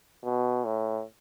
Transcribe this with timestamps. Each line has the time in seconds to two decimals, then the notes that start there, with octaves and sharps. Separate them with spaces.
0.24 B2
0.65 A2